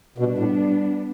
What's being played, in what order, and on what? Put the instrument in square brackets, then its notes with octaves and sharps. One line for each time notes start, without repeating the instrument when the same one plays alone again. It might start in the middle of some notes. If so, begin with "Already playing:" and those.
[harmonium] B2 [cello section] G3 B3 D4
[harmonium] A2